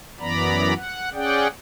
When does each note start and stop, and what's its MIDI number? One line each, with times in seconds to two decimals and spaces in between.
0.20 0.74 42
0.20 0.74 52
0.20 0.74 59
0.20 0.74 74
0.20 0.74 82
0.20 0.74 83
0.75 1.09 78
1.14 1.47 61
1.14 1.47 68
1.14 1.47 74
1.14 1.47 78
1.14 1.47 79